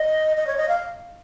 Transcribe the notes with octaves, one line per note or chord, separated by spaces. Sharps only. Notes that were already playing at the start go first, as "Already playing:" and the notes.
Already playing: D#5
D#5
C#5
D#5
F5